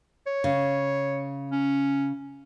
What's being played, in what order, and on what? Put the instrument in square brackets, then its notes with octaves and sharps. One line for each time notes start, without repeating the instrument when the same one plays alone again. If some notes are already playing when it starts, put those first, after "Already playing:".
[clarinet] C#5
[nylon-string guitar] C#3
[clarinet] C#4